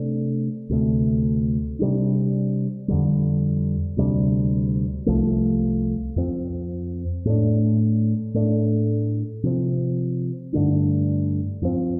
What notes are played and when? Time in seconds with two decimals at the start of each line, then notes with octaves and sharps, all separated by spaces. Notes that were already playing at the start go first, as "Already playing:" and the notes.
Already playing: C3 A3 D4
0.69 D2 C3 A3
1.79 C3 G3 D4
2.88 F2 D3 G3
3.97 D2 C3 G3 D4
5.06 C2 C3 F3 A3
6.16 F2 F3 C4
7.25 A2 A3 D4
8.34 A2 A3 D4
9.43 C3 F3 C4
10.53 G2 D3 A3 D4
11.62 F2 F3 C4